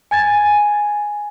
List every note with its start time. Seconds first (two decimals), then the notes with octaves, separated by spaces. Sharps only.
0.11 G#5 G#6 A6